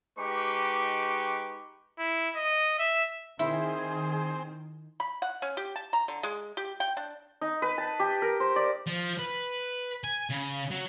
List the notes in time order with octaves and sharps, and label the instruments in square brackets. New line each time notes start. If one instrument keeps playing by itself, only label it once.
[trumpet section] G#3 D#4 G4 B4 C#6 D6
[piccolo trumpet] E4
D#5
E5
[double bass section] D#3 [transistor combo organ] C4 [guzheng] E4 [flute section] G#4
[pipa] B5
F#5
C#4
G4
A5
A#5
D3
G#3
G4
G5
D4
[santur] D#4
B4
A5
G4
A#4
C5
D5
[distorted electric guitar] F3
B4
G#5
C#3
F#3